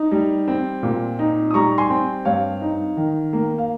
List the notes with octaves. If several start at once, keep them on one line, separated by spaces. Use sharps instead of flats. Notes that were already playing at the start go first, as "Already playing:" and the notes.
Already playing: D#4
G3
C4
A#2
D#4
D#6
G3 A#5 C#6
G#5 C6
C4
G2 C#5 F5
D#4
D#3
A#3
F5